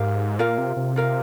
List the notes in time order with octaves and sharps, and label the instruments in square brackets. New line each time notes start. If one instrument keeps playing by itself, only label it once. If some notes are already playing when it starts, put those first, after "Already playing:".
Already playing: [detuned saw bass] G#2 [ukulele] G4 A#4 F5
[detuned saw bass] A#2 [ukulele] F4 A#4 F5
[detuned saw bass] C3
C3
[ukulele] F4 A#4 F5